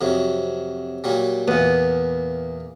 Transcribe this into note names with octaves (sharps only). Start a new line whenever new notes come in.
F2 C3 F#3
A#2 F#3 G3
E2 A#2 B3